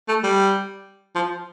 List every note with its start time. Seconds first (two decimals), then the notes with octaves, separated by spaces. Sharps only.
0.08 A3
0.24 G3
1.15 F3